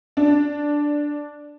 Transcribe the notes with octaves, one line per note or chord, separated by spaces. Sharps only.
D4